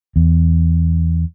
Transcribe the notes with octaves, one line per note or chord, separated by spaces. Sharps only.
E2